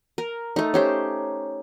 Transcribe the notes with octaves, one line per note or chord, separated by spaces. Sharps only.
A#4
A3 D#4
C#4 G4 C5